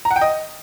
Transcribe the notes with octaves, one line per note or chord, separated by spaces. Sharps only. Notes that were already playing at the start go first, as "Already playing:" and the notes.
A#5
F#5
G5
D#5